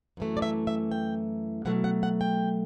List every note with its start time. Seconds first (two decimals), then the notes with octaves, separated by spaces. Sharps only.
0.17 F#2 E3 A3
0.37 D5
0.42 E5
0.67 E5
0.91 G5
1.65 B2 F#3 A3 F#5
1.84 F#5
2.03 F#5
2.21 G5